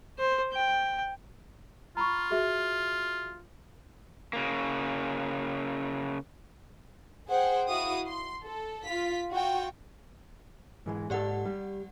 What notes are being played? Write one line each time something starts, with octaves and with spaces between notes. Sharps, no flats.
C5
G5
F4 A#5 B5 C#6
F#4 G#4 E5
C#3 A#3
G#4 C5 F#5 G5
E4 F#4 F5 D#6
C6
A4
F4 B6
F4 F#4 G5
G#2 E3 G#3
G#2 G4 A4 D5 F#5
G3